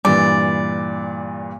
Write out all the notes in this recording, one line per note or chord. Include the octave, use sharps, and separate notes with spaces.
G2 A#2 E3 D5